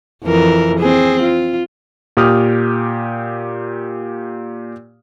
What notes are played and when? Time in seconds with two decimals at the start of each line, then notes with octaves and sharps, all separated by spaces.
0.25 F2 E3 A#4
0.80 C4 G#4
1.22 F4
2.17 A#2 G4 D#6 F6